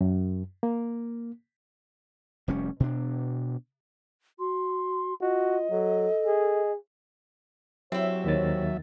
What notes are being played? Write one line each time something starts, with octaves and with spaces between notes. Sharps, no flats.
F#2
A#3
F1 G3 C#4
B2 D4
F#4 C6
F4 F#4 D#5
F#3 A4
G#4
F#3 C4 E4 G4 C5 C#5 E5
D#2 D#3 A6